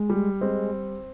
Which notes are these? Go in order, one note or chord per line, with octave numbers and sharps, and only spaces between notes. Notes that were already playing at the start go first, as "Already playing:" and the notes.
Already playing: G#3
G3
G#3 C4